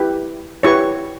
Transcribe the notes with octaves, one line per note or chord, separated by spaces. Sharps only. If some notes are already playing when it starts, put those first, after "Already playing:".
Already playing: E4 G4 B4
E4 G4 B4 C#5 C#6